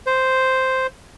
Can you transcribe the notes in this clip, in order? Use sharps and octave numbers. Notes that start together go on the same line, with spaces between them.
C5